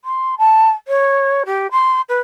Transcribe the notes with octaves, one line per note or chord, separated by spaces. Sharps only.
C6
A5
C#5
G4
C6
B4